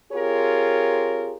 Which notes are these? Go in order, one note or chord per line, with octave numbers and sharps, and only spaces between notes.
C4 F4 G4 G#4 A#4 C#5